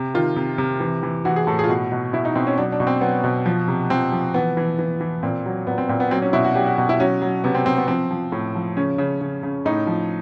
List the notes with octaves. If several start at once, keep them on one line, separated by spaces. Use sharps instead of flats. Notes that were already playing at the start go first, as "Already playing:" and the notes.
Already playing: C3
D#3 F4
C3
C3
E3
E3
E3 F#4
G#4
A2 A4
G#4
F4
B2 F#4
B2
B2 E4
D#4
B2 C4
C#4
F#3 D4
D4
B2
C4
F#3 B3
B2
F3
C3
F3 C4
F3
E3 B3
E3
E3
E3
A#2 C4
F#3
A#2 B3
C4
A#2 C4
B3
F#3 C4
C#4
B2 E4
F#4
F#3 G4
F#4
B2
E4
F#3 C#4
F#3
C3 B3
C4
C3 C4
B3
F3 C4
F3
A2
F3
C#3 C#4
C#3
C#3
C#3
A2 D#4
F3